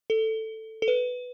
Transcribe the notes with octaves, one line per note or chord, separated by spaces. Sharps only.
A4
A4
B4